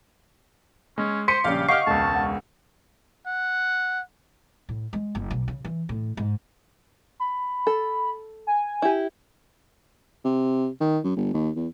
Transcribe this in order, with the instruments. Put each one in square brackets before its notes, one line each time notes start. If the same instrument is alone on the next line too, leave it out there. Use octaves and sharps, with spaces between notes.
[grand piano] G#3 [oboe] C#4
[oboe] C5 [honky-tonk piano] C6 C#7 [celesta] B6 [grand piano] D#7
[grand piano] A#1 C#3 G3 [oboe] G4 [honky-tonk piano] F5
[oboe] G4 [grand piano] D#5 [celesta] F5 F#5 C7 [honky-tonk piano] C#6 F6
[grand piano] E1 C#2 [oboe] A5
[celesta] F#5
[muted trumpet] F#5
[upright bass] A2
G#3
F#1
B1
C#3
E3
A2
G#2
[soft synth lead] B5
[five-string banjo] A4
[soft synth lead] G#5
[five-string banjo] E4 G4
[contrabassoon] C3
D#3
F#2
G1
D#2
E2